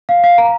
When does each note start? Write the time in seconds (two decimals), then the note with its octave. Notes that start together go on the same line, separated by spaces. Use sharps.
0.09 F5
0.24 F5
0.38 A#5